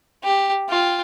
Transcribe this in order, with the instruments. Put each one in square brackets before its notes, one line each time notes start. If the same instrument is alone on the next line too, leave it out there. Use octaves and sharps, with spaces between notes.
[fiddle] G4
F4 G5